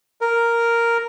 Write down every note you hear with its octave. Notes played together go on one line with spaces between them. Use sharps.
A#4